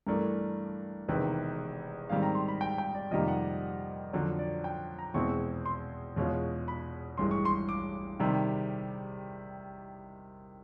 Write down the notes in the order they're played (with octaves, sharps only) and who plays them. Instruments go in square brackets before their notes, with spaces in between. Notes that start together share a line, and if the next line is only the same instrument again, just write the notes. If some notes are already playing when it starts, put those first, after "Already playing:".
[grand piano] G2 E3 A3 D4 A#4
E1 E2 C3 D#3 B4
G#2 D#3 G3 C4 F5
A#5
C6
B5
G5
G5
D5
F2 C3 D#3 G3 A#3 D#5
F#5
F2 D3 F#3
D5
G5
A#5
E2 B2 G#3 C4 E4 C#6
C6
E2 B2 G#3 C#4 F4
B5
A1 G2 E3 G#3 C6
C#6
C6
D6
C3 D#3 G3